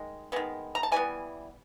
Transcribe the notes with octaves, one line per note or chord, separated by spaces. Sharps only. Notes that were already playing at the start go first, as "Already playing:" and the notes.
Already playing: D#3 G#3
D#3 G#3 B3
A#5
A5
E3 G3 B3 G#5